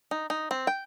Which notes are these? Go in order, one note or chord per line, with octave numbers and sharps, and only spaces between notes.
D#4
D#4
C4
G5